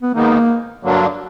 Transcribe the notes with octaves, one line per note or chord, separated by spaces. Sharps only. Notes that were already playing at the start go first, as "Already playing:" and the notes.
B3
G#2 D#3 G#3 A#3 B3 D#4
G2 D3 F#3 A#3 D4